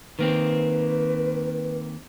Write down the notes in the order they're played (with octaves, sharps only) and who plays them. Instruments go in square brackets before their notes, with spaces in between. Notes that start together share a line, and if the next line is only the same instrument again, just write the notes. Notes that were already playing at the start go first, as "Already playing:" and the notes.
[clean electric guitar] D#3 A#3 C4 [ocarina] B4